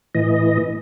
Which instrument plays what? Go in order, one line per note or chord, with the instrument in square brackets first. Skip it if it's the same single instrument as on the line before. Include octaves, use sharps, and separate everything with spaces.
[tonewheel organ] A2 E3 D#5